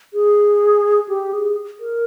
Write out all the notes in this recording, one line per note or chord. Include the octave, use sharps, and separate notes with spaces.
G#4
G4
G#4
A#4